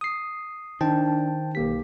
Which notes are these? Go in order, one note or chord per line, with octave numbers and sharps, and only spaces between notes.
D#6 C7
D#3 D4 C5 G5 A5
B1 A#3 G4 B6